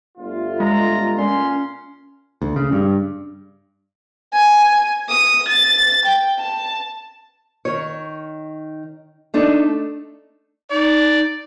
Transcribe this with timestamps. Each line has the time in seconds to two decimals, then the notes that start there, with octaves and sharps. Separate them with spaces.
0.18 G1 A3 F4
0.60 G#3 A#5
1.18 A#2 C#4 C6
2.42 D2
2.56 C#3
2.72 G2
4.33 G#5
5.08 D#6
5.48 A6
6.05 G5
6.39 A5
7.65 D#3 C#5
9.34 A3 D4 D#4 A4
10.71 D#4 D5